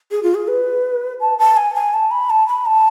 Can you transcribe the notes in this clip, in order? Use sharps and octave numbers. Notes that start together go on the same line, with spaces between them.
G#4
F4
G#4
B4
A5
A5
G#5
G#5
A5
B5
A5
B5
A5